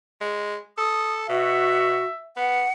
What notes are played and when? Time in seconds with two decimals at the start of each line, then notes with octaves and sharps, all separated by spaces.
0.21 G#3
0.78 A4 D#6
1.29 B2 F#4 E5
2.37 B3 F#5